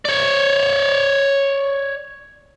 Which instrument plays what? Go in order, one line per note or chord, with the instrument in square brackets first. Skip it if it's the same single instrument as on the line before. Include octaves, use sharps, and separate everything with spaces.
[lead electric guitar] C#5 D5